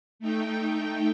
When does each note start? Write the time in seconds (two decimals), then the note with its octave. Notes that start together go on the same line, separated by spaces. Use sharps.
0.19 A3 D#4 G5